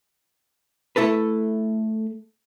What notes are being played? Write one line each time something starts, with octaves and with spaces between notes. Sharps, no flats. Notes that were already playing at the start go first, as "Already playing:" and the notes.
A3 E4 A4 B4